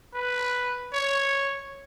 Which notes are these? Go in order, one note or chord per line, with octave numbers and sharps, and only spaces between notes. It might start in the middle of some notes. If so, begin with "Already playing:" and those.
B4
C#5